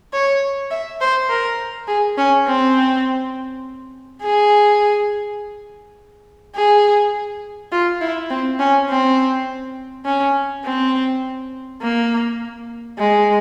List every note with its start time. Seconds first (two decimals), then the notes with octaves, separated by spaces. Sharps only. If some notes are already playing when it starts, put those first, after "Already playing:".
0.13 C#5
0.71 E5
1.01 C5
1.30 A#4
1.87 G#4
2.18 C#4
2.47 C4
4.22 G#4
6.55 G#4
7.72 F4
8.01 E4
8.30 C4
8.59 C#4
8.89 C4
10.05 C#4
10.64 C4
11.81 A#3
12.98 G#3